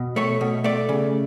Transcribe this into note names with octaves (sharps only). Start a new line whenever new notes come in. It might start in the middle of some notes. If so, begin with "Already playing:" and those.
Already playing: B2
A3 C#5
B2
A3 D5
C#3